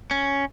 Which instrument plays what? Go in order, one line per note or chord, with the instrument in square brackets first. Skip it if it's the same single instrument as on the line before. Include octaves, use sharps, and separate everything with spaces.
[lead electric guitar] C#4